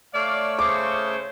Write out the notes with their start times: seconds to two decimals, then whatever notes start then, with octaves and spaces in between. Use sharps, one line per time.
0.14 A3 C#5 D5 F5 E6
0.59 C#3 C5 D6